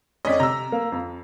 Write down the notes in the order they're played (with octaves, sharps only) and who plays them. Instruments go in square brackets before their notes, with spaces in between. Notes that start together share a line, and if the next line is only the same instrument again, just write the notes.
[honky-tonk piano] F2 D#5 [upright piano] C#4 D4 B6
[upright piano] C3 A#6 [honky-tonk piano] A#5 E6
[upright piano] A#3
F2